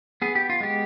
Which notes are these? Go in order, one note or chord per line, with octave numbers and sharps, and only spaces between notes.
B3 G#4
G4
F4
G#3 G4